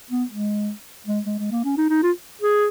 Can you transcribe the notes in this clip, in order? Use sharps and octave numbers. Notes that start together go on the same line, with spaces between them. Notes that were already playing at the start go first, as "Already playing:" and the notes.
B3
G#3
G#3
G#3
G#3
A#3
C#4
D#4
D#4
F4
G#4